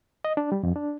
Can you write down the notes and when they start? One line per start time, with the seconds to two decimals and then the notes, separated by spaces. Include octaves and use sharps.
0.25 D#5
0.37 D4
0.52 G3
0.63 F2
0.76 D4